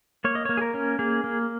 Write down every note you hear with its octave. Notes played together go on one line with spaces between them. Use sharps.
A#3 C#5
D#5
A#3 C#5
G#4
A#4
C#4
A#3 G#4
A#3